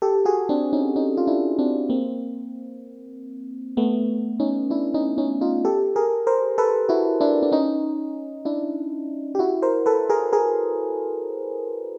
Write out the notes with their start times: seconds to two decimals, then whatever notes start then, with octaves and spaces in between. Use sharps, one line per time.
0.02 G4 A4
0.25 F#4 G#4
0.49 C4 D4
0.73 C#4 D#4
0.96 C#4 D#4
1.17 F4
1.27 D4 E4
1.59 C4 D4
1.90 A#3 C4
3.77 A3 B3
4.40 C#4 D#4
4.70 D4 E4
4.94 C#4 D#4
5.18 C#4 D#4
5.41 D#4 F4
5.65 G4 A4
5.96 G#4 A#4
6.27 A#4 C5
6.58 A4 B4
6.89 E4 F#4
7.21 D4 E4
7.42 D4
7.52 C#4 D#4
8.45 D4 E4
9.35 G4
9.39 E4 F#4
9.62 A#4 C5
9.86 A4 B4
10.09 G#4 A#4
10.33 G#4 A#4